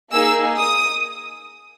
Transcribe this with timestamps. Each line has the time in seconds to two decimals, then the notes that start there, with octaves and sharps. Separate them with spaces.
0.11 A#3 D#4 G#4 E6
0.59 D#6